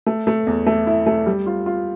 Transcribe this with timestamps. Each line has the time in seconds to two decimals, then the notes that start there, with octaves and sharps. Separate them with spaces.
0.06 A3
0.27 A3
0.47 E2
0.66 A3
0.87 E4
1.06 A3
1.26 G3
1.46 F4
1.66 F4